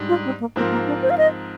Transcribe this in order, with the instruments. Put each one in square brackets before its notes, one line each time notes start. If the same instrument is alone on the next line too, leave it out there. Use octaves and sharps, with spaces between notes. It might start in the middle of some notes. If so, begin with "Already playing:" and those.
Already playing: [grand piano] G#2 G3 D4
[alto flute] F4
C4
A#3
[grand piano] G#2 F3 C4 F4 A#4 [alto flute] A#3
[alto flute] A#3
D4
C5
F5
D#5